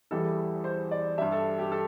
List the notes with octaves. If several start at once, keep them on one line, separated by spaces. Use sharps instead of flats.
E2 E3 G3 A4
C5
D5
G2 G3 E5
A4
G4
A4